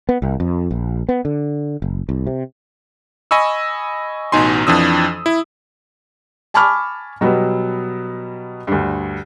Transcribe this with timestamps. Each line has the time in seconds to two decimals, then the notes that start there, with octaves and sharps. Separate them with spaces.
0.09 B3
0.22 C2
0.40 F2
0.71 A#1
1.09 B3
1.25 D3
1.82 F#1
2.09 C2
2.27 C3
3.31 D#5 G#5 B5 C#6 E6
4.32 A1 B2 D#4 G#5 C6
4.67 F2 E3 F3 D4 D#6 E6
5.26 E4
6.54 G#5 A5 B5 C#6 D6 F6
7.21 B2 F#3 G3 B3
8.67 D2 G2